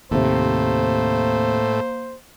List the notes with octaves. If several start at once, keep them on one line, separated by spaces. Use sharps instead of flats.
D#2 A2 C3 A#3 C5